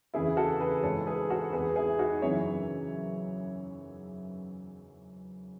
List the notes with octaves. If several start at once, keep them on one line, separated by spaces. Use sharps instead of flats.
E2 C#3 E3 E4 G#4
F#4 A4
G#4 B4
G#2 E3 A4 C#5
G#4 B4
F#4 A4
E2 B2 G#4 B4
E4 G#4
D#4 F#4
F#2 C#3 E3 C#5 E5